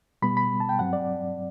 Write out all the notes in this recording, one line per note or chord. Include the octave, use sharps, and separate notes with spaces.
B2 G3 B3 B5
B5
A5
G5
G2 F#3 C4 F#5
D5